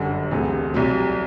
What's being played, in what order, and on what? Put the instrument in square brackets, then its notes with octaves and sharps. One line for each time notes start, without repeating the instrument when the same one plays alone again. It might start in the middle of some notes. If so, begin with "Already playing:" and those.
Already playing: [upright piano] G1 F#2 D3 G3 F#5
E1 D2 C3
C2 C3 F#3